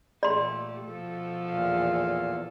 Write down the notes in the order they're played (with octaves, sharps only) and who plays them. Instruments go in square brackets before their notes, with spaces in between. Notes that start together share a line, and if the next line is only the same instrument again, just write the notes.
[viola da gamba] A#2 A3 G4 [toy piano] D5 C6
[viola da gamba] B2 F3 A4
[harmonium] E2 A#2 F5